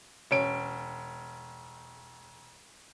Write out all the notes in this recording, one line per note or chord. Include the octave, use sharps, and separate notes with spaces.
E1 C#4 D7